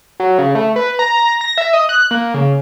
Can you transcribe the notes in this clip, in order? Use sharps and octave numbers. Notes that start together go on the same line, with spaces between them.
F#3
C#3
A3
B4
A#5
A#6
E5
D#5
F#6
A#3
C#3